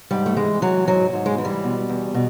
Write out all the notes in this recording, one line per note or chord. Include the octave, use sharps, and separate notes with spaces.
G#2 G3
A3
E3 G#3
E3 F#3
G#2 F#3
G#2
G#3
E3
G3
B2
E2
B2